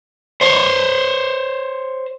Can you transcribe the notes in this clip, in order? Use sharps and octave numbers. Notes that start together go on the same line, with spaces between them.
C5 C#5